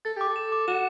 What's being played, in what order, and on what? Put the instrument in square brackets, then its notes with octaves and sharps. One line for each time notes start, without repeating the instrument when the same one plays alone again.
[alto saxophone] A4 [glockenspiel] A6
[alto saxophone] G4 [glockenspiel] D6
[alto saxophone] A4
[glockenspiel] E7
D6
[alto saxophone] F#4 [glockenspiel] E7